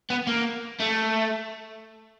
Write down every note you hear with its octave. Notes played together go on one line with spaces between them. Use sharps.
B3
A#3
A3